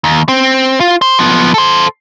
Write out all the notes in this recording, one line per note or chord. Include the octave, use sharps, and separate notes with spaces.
D#2
C4
F4
C5
F3 B3
A4 C5